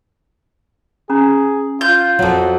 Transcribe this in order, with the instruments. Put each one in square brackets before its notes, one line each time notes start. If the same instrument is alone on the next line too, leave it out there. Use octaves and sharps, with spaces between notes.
[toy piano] C#4 A#5 [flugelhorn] G#4
[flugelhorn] F4 [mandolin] G6
[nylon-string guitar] F2 F#3 [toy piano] C#5